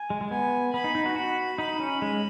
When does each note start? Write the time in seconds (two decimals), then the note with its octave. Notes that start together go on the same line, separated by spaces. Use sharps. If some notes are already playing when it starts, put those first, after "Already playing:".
Already playing: G#5
0.10 G#3
0.21 G#3
0.31 B3 G#5
0.73 B3 B5
0.84 D#4
0.95 D#4
1.06 F#4
1.16 F#4 B5
1.58 D#4 B5
1.80 C#4
2.02 G#3